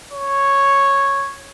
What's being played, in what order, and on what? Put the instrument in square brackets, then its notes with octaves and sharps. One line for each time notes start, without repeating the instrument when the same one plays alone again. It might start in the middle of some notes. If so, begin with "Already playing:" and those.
[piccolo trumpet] C#5